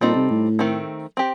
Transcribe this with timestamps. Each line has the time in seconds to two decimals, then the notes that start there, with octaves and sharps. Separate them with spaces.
0.01 A#2 G3 C4 D#4 A4
0.15 C3
0.30 A2
0.59 D#3 A3 C4
1.17 C4 G4